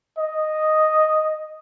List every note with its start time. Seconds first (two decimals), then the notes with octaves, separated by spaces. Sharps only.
0.18 D#5